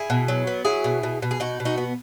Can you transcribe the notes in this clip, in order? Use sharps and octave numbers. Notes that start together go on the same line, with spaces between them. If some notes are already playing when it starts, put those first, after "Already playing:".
Already playing: E4 G#4
B2
F#3
B3
F#3 E4 G#4
B2
B2
B2
G#4
B2 D#4 F#4
B2
D#4 F#4
B3